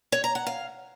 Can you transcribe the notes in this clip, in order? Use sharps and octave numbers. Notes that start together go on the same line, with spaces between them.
C#5
A#5
F#5
F5